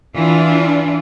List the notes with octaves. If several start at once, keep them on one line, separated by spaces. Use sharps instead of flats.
E3 D4 F4